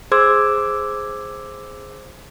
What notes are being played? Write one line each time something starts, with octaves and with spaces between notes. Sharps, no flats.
G#4 C5 C6 D6 E6 G#6